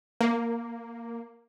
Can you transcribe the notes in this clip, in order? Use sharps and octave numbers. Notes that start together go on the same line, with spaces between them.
A#3